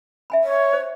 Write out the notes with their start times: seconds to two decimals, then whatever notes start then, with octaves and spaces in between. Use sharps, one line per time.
0.30 E5 G#5 B5
0.43 C#5
0.73 C5